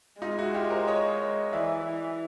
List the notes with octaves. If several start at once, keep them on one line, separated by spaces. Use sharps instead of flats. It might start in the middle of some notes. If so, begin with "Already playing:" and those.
G#3 D#4 F4
E4 F#4
F4 G4
A#4 C5
C#5 D#5
E3 D5 E5
E3